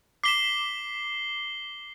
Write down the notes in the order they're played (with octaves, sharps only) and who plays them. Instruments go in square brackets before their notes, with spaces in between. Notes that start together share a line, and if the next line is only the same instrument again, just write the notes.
[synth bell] D6 B6 E7 [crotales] C7 G7